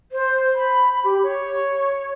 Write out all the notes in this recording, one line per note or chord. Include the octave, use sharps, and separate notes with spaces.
C5
B5
G4
C#5